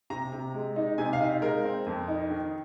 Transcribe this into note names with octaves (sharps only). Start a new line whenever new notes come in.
C3 A#5
C3
G#3
D#4
C3 G#5
F5
D#4
G#3 A#4
C4
F2
D#4
D#3